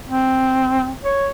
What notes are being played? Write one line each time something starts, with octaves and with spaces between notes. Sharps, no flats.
C4
C#5